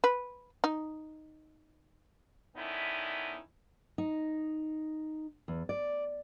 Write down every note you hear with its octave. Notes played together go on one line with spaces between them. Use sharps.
B4
D#4
D3 D#3 B3 C#4 D#4 E4
D#4
E2
D5